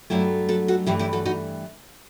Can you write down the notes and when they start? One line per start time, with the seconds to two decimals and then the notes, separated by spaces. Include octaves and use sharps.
0.10 G2 F#3 A3 E4 G4
0.49 F#4 A4
0.68 F#4 A4
0.86 G2 E3 A3 E4 G4
0.99 E4 G4
1.13 F#4 A4
1.25 D#4 F#4